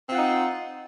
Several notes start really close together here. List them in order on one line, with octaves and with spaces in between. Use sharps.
C4 F4 F#5 D#4